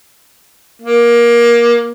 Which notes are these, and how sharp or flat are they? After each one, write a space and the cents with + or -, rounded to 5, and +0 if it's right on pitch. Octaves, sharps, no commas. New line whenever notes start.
A#3 +20